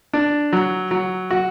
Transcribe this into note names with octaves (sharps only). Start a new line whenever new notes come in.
D4
F#3
F#3
F#4